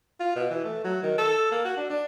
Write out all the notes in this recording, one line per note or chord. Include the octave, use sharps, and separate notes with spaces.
F4
B2
E3
A3
F#3
D#3
A4
A#3
F#4
D4
D4